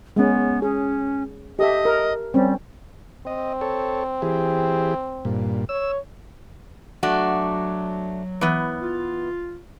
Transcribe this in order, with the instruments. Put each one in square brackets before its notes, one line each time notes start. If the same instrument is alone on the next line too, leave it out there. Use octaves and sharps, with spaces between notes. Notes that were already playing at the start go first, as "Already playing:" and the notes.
[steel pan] G#3 C#4 [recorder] B3
[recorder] C#4 [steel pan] G#4
[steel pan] G4 A4 E5 [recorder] D#5
[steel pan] A#4
[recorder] G3 [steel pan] C4 C#4
[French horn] C4 [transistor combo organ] D#5
[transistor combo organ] A4 C#5
E3 G4 G#4
G2 A#2
[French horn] C#5 [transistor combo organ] E6
[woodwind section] F#3 [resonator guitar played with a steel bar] A3 D4 F#4
[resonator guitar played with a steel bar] E3 B3
[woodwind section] F4